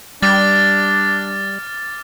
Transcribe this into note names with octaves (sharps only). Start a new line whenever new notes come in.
G3 D4 D6 F6 A6